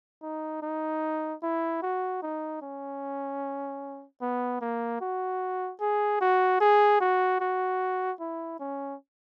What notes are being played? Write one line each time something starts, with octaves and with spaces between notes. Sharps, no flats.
D#4
D#4
E4
F#4
D#4
C#4
B3
A#3
F#4
G#4
F#4
G#4
F#4
F#4
E4
C#4